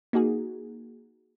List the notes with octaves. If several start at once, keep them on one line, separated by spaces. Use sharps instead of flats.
A#3 D#4 F#4 G#4